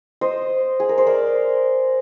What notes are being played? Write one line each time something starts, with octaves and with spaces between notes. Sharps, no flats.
C5 D#5
G#4
A#4
C5
A#4 D5